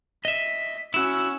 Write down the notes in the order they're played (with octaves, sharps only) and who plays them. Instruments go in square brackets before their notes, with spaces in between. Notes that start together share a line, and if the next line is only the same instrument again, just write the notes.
[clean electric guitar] D#5 E5 [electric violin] B6
[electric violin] C#4 E6 [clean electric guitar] E4 F#4